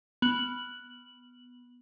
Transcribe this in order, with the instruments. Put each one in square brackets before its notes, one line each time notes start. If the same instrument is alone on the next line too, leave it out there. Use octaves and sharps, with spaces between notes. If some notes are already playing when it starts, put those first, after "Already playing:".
[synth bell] B3 F#7